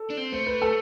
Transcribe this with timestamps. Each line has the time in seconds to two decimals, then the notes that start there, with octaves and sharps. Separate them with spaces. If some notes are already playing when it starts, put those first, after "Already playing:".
Already playing: A4
0.10 D4
0.17 C4
0.32 A3 C5
0.47 B4
0.62 A4